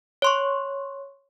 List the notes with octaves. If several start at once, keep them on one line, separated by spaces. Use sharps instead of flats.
C#5 C6 C#6